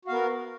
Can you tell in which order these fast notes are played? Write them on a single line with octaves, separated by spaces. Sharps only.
F#4 F5 B3 A#4